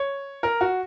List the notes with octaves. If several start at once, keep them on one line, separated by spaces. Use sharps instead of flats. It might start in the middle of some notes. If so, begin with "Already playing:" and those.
Already playing: C#5
A#4
F#4